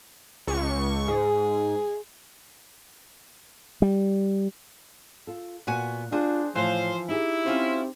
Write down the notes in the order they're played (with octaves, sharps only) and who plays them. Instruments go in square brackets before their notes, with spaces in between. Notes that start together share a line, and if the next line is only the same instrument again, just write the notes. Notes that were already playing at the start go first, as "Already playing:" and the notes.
[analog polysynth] C#2 C#6
[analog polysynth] G#2 [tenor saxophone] G#4
[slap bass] G3
[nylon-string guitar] F4 A4
[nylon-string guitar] A#2 [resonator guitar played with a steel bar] B3 F#4 G#5
[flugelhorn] D4 [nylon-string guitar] F4 D5 [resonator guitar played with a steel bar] F#4 G#4 C5
[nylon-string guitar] A2 A5 [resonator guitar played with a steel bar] E3 [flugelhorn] F3 [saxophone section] C5 F5
[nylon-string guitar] D#4 G4 G#4 [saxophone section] E4
[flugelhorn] C4 [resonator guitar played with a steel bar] C#4 F4 C5